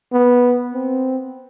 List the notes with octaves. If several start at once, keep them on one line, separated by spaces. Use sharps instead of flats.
B3
C4